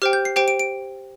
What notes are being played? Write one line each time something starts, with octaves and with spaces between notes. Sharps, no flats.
G4 C5 G5 F6
G6
C7
G4 C5 G5 D7
D7
D7